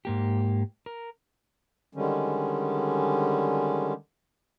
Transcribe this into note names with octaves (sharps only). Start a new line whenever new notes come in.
G#2 A#3 G4
A#4
D3 D#3 G3 G#3 C#4